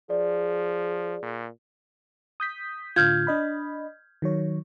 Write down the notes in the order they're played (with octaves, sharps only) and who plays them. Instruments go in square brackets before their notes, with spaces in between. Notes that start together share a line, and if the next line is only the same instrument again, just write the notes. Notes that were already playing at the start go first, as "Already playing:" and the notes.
[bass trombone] F3 [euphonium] G#4 [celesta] D5
[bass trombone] A#2
[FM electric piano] D#6 G6 B6
[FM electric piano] A2 D3 F4 [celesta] F6 G6 G#6
[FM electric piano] D4 D#5 B5
D#3 F#3 C#5